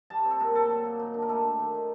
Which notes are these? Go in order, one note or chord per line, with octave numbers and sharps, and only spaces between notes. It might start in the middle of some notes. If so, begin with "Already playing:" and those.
G3 A5
C4
A4
A#2 A#4
A#2 A4
F#3
A#3
D#3
D4
A#4
A3 A4
D4
D#3
D#3